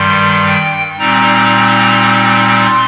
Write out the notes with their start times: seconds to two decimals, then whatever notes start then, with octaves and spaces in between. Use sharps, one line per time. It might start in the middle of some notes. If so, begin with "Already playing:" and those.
Already playing: G2 D#3 G3 C6
0.47 G5
0.99 A#2 G3 C4 D#4 A#5
2.57 C6